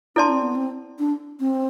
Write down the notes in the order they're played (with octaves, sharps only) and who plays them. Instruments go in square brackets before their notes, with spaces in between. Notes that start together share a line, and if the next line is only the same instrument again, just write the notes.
[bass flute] D4 [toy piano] E4 A4 D5 A5 C6
[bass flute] C4
B3
C4
D4
C4